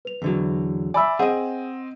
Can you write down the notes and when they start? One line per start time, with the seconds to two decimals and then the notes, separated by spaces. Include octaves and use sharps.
0.05 B4 F7
0.22 E2 D3 F#3
0.94 D5 E5 G#5 B5 E6
1.19 C4 G#4 D#5 F#5